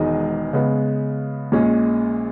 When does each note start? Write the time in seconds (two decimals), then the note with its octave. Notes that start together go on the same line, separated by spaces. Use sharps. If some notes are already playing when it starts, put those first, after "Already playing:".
Already playing: E1 E2 D#3 G#3 D#4
0.53 C#3 G#3 B3
1.52 A#1 A#2 G#3 C#4